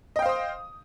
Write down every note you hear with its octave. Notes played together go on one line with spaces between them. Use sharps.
C5 D#5 F5 G5 D#6